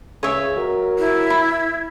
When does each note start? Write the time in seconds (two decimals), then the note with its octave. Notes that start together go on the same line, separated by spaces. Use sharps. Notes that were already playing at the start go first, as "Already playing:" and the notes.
0.23 C#2 C#3 C#5 E5
0.57 F#3 A#4
0.99 E4
1.30 B5